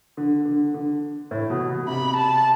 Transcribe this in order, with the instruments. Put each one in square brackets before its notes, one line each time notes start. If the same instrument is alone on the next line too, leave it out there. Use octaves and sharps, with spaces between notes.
[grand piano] D3
D3
D3
A2
B2
B2
[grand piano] C3 [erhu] B5
[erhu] A5